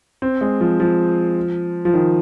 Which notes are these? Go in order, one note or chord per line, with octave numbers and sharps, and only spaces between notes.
C4
G#3
F3
F3
F3
D#3